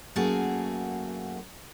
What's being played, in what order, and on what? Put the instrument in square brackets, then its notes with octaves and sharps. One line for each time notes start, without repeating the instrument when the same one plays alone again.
[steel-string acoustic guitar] F#2 A3 A#3 F#4 G#4 A5